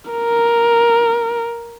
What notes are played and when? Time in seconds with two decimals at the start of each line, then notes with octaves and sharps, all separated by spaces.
0.11 A#4